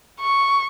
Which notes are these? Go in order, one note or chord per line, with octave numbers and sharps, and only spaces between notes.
C#6